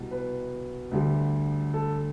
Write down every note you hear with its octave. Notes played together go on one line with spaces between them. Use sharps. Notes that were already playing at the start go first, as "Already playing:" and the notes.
Already playing: C2 B2 G3
B4
D2 D3 G3
A4